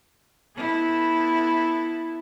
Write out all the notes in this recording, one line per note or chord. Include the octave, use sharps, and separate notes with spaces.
B3 E4 A4